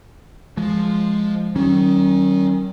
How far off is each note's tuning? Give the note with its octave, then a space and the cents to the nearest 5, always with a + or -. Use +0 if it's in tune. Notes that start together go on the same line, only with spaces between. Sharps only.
F3 +0 G#3 +0
D#3 +0 F#3 +45 C#4 -20